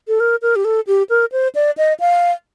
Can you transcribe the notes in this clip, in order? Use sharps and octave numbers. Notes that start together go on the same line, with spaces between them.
A4
A#4
A#4
G4
A4
G4
A#4
C5
D5
D#5
F5